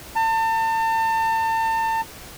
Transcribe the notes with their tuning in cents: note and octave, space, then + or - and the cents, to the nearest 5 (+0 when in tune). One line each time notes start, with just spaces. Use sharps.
A5 +35